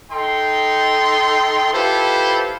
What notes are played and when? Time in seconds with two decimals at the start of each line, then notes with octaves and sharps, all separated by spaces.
0.12 D#4 A4 G5 C6
1.73 E4 F4 G4 A4 B4 C5